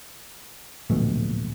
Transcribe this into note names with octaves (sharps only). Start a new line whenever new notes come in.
D1 A#1 B2 A3